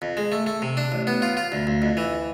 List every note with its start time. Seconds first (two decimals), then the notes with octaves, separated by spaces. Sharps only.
0.02 F2
0.17 G#3
0.32 A3
0.46 A3
0.62 C3
0.77 D4
0.92 A1
1.07 B3
1.22 F4
1.37 F4
1.52 D2
1.67 D2
1.82 F2
1.97 E3